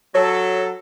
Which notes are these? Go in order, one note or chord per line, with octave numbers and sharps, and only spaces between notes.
F#3 A4 C#5